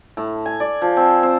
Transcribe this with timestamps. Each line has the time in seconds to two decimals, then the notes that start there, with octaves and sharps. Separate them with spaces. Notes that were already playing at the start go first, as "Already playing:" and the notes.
0.17 A2
0.46 G#5
0.60 D5
0.82 F3
0.97 C4
1.23 C4